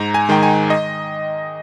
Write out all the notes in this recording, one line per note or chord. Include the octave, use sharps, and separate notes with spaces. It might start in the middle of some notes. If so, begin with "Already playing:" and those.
Already playing: G#2 A#5
G#5
D#3 G#3 G5
G#5
D#5